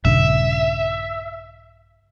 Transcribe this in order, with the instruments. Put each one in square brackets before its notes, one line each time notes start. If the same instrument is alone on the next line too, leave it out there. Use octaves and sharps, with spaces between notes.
[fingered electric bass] A#1 G2 C#3 [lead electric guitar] E5